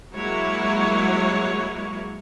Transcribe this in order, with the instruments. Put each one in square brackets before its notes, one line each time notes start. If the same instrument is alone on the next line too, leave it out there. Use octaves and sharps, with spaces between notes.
[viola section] F#3 G#3 A#3 E4 C#5